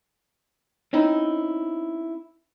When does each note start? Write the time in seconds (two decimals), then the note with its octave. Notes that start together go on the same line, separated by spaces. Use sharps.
0.93 C4 C#4 D#4 E4